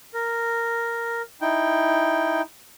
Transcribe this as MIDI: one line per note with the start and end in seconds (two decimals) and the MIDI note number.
0.14 1.22 70
1.41 2.41 63
1.41 2.41 64
1.41 2.41 79